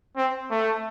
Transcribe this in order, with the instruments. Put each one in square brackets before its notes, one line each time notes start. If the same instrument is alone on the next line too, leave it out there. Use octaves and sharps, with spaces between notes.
[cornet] C4
A3